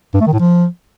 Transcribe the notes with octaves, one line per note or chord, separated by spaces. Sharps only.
G2
A3
D#3
A2
F3